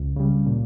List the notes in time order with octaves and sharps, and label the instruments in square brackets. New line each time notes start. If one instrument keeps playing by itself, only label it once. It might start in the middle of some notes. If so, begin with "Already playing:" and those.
Already playing: [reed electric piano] C#2
C#3 G3
A#2